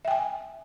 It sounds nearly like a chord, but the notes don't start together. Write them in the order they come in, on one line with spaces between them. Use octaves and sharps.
E5 G5 G#5